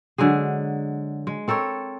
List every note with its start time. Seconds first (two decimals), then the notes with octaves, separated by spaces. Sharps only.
0.18 D3 F#3 G#3 G#4
1.27 G#3
1.48 C4 A4 A#4 C#5